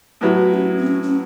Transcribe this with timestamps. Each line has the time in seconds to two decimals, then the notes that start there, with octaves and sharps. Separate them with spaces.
0.21 A2 F#3 B3 E4 G4
0.38 F#4
0.54 C#4
0.77 C4
0.87 C#4
1.03 C#4